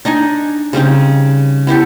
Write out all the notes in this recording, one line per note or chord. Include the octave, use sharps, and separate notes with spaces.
D4 D#4 D#5 G#5
C#3 G3 C4 D#4
B3 E4 G4 A4